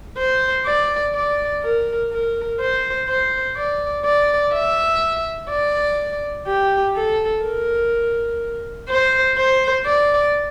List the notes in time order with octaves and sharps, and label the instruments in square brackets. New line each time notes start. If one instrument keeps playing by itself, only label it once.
[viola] C5
D5
D5
A#4
A#4
C5
C5
D5
D5
E5
D5
G4
A4
A#4
C5
C5
D5